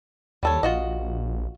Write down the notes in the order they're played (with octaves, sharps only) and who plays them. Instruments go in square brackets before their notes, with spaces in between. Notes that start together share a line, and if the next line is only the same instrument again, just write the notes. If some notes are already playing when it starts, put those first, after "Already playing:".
[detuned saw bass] D#2 [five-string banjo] G3 A4 C#5
[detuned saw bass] A#1 [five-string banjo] F4 F#4 D#5